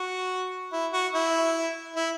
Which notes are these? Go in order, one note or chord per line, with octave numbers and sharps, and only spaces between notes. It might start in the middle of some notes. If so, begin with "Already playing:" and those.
Already playing: F#4
E4
F#4
E4
E4